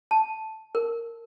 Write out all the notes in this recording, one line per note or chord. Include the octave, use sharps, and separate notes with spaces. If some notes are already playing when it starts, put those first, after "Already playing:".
A5
A#4